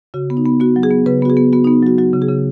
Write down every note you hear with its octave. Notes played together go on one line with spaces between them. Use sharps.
C#3 F#4
B3
D#4
B3
B3 F#4
F#3
G#4
B3
C#3 B4
B3 F#4
G#4
B3
B3 F#4
B3 D#4
F#3 F#4
F#3 F#4
C#3
G#4
C#3